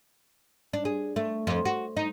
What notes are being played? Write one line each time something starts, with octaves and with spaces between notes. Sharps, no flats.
D4
G#4
A3
F2
F#4
D#4